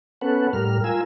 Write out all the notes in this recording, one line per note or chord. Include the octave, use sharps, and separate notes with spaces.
B3 C#4 A4 B4 F#5
A2 G3 A#4 F6
F4 A#4 G#5 E6